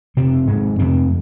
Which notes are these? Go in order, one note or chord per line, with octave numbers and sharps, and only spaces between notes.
F2 C3 C4
G#2 C3 G#3
F2 C3 C4